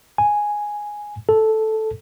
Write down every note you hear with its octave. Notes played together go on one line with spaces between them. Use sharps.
G#5
A4